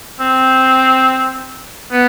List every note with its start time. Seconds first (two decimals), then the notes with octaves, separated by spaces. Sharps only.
0.20 C4
1.92 B3